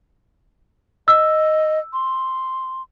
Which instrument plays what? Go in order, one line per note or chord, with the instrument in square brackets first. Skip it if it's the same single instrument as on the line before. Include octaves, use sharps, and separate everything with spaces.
[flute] D#5 [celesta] E6
[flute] C6